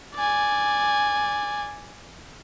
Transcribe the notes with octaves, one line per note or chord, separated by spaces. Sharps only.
D5 G#5